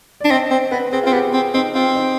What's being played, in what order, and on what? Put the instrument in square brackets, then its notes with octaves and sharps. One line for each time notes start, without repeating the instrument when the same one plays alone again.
[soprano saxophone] D4 [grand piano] D5
[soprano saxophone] C4 [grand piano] D#5
[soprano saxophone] C4 [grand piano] C5
[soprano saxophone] B3 [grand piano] B4
[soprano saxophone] C4 [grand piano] G#4
[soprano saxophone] C4 [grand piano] F4
[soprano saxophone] B3 [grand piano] G4
[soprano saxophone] C4
[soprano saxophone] C4 [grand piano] D#4
[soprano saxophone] C4 [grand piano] F4
[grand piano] D#4